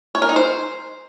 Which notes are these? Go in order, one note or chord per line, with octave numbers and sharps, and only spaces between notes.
C#5
A#4
D#4
C5